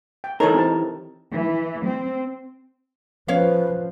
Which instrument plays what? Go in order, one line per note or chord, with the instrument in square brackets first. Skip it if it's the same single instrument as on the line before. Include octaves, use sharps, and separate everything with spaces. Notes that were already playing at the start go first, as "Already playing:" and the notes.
[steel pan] G5
[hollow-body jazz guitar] E3 A#4 [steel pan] D#4 A4 C#5
[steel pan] C4 G4 A5
[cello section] E3
C4
[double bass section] F3 [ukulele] C#4 C#5 F5 [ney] B4